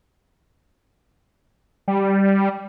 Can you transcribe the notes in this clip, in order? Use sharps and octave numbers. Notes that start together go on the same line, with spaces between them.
G3